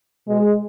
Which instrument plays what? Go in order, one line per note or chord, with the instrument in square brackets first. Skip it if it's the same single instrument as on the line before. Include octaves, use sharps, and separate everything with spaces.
[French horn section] B2 G#3